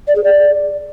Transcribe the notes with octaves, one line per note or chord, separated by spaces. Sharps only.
D5
G#4
D5